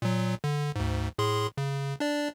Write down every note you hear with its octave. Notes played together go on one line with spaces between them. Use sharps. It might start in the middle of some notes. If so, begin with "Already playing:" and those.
A#2 F#3
D3
D2 G#2
A2 G#4 C6
C#3
D4 D5